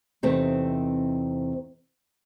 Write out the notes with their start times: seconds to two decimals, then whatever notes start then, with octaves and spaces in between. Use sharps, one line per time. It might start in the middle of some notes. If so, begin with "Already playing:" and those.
0.23 E2 C3 A3 C4 D#4